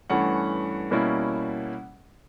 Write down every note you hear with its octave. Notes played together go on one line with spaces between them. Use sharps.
G2 E3 A3 C#4 F#5
B2 G3 A#3 C#4 E4